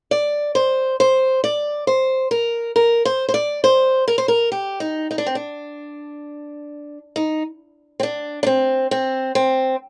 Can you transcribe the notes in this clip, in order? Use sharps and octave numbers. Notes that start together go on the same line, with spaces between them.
D5
C5
C5
D5
C5
A#4
A#4
C5
C5
D5
C5
A#4
C5
A#4
G4
D#4
D#4
D4
C4
D4
D#4
C4
D4
D4
C4
C4
C4